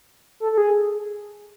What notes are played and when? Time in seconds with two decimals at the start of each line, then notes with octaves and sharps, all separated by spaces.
0.40 A4
0.52 A4
0.58 G#4